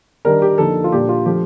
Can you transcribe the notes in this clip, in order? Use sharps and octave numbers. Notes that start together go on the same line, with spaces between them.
D#3 G3 D4 A#4
G4
D3 F3 A#3 D#4 A4
F4
A#2 G3 D4 G4
F4
F3 A3 D4 G4